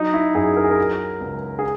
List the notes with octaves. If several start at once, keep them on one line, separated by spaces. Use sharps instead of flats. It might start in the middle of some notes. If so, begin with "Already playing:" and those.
Already playing: F#3 D#4
E4
F#2 G#4
A#4
G#4
A#4
F#3
C#2
G#4